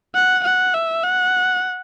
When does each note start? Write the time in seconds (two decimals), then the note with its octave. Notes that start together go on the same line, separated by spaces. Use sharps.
0.15 F#5
0.44 F#5
0.74 E5
1.04 F#5